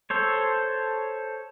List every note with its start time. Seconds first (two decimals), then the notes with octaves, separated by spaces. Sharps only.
0.10 A4 C5 C#5